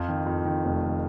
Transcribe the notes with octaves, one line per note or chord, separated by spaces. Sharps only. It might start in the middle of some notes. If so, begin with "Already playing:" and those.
Already playing: F2 F4
D#3
F2
D#3
F1
D#3